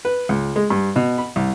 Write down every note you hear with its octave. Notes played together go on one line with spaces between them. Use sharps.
B4
C#2
G#3
G2
B2
B5
C2